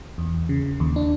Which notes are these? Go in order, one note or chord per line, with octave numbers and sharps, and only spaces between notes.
E2
C#3
D#2
D4